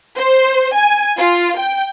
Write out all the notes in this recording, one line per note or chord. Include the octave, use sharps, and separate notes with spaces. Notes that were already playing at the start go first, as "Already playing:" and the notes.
C5
G#5
F4
G5